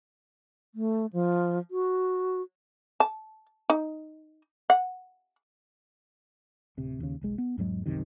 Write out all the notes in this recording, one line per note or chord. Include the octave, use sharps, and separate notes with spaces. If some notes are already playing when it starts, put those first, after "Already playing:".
A3
F3
F#4
A5
D#4
F#5
D1 C3
D#2 C#3
E1 B1 G#3
B3
E2 G#2 F#3 G#3
C2 F#2 C3 D#3